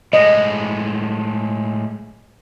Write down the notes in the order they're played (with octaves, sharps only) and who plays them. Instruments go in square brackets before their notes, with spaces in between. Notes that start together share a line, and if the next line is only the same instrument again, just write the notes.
[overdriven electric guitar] A2 G#3 [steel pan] D#5